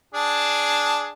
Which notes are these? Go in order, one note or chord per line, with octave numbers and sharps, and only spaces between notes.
D4 G#4 A5